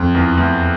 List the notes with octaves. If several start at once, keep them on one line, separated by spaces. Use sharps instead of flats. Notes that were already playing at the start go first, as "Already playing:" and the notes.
Already playing: F2
E2
E2